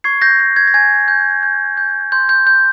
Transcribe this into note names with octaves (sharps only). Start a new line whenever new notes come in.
C#6 G#6 C7
G6 A#6
G6
G#6
A#6
G#5 G#6
G6
G6
G6
C6 G6
G6
C6 G6